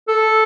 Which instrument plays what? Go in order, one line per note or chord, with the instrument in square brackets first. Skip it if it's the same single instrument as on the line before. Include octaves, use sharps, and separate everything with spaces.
[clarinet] A4